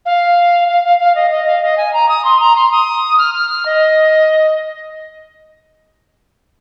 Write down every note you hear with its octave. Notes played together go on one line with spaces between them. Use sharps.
F5
F5
F5
F5
D#5
D#5
F5
D#5
G#5
A#5
D#6
C6
A#5
C6
D#6
F6
F6
F6
D#5